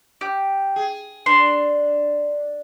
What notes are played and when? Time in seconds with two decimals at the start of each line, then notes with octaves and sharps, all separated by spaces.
0.21 G4
0.76 G#4
1.26 D4 C6